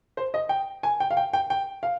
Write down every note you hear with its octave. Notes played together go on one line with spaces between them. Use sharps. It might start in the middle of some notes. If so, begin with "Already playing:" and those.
C5
D#5
G5
G#5
G5
F5
G5
G5
G5
F5